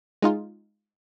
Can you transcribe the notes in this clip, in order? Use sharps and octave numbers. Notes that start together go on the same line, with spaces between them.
G#3 D#4 F4